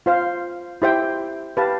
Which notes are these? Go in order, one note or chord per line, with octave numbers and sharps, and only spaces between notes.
F4 C5 F5
E4 G4 C5 E5 G5
G4 B4 F5 A5